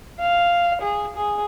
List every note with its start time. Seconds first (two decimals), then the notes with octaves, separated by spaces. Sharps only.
0.20 F5
0.82 G#4
1.16 G#4